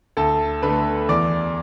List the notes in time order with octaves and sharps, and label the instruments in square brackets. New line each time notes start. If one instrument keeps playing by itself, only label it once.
[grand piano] D2 A4 A5
D3 A3 B4 B5
E2 D5 D6